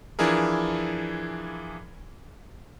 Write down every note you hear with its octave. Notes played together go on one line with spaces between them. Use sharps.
E3 F3 D4 E4 G#4 A#4